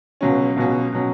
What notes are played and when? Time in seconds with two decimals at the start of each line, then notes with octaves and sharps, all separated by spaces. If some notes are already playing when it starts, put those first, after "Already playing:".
0.21 C#2 B2 F#3 C#4
0.56 C#2 B2 F#3 C#4
0.92 B2 F#3 C#4